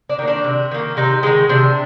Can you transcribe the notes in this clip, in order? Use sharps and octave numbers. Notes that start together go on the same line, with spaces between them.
D4
D#3 A#3
D4
C3
D#3 A#3
C3 D#4
D#3 G#3
C3 D4